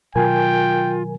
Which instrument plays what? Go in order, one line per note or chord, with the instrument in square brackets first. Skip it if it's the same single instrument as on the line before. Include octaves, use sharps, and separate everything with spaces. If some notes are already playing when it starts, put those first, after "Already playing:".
[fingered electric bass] B2 D#3 F#3 [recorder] F4 [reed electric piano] A#4 G#5 [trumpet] G5